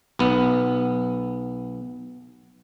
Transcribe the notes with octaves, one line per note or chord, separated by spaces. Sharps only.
B1 B3